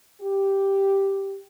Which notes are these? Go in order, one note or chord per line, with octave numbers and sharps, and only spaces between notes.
G4